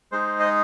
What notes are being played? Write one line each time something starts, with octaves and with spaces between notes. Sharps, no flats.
G#3 D#4 G#4 C5
D#5